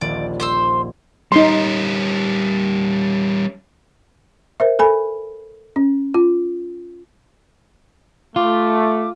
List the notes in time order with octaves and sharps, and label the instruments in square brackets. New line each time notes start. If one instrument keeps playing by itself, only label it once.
[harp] D#1 A#1 [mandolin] D5
[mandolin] C5 C6 E6
[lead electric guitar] G3 C#4 [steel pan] D#4 C6
[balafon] A#4 C5 E5
A4 G#5 B5
C#4
F4
[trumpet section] A3 [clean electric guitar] F4 [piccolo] D6